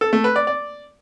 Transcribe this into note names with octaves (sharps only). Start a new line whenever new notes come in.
A4
A3
B4
D5
D5